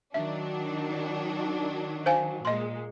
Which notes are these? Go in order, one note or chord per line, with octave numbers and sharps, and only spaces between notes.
D#3 F#3 D4 E5
C5 F5 G#5
A#2 G#3 D#5 C6